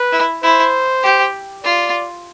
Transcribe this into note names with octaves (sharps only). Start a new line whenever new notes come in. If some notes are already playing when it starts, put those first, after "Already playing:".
Already playing: B4
E4
E4 C5
G4
F4 D5